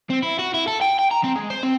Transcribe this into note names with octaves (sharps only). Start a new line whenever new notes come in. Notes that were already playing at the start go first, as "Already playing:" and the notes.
C4
E4
F#4
E4
A4
G5
G5
A#5
C4
G#3
C5
C4